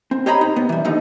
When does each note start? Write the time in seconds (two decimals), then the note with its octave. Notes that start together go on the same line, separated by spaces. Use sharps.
0.11 C4
0.26 G4 C5 C#5 D#5 A#5 B5
0.41 D#4
0.56 B3
0.69 E3 G3
0.85 D#2 D3 F3 D#4